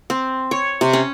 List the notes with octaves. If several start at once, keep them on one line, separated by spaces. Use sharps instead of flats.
C4
C#5
C3
C#4